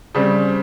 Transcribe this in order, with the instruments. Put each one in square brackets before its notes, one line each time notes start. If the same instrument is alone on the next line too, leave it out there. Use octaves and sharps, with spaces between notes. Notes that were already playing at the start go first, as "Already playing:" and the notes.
[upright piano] C#3 G3 C4